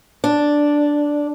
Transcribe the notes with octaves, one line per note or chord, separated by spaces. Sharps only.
D4